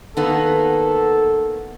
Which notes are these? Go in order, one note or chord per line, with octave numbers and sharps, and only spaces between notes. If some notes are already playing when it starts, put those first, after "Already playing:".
D#3 A#3 B3 A4